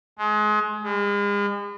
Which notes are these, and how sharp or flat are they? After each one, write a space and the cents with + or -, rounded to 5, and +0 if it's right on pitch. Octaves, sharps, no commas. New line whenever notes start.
G#3 +30
G#3 -40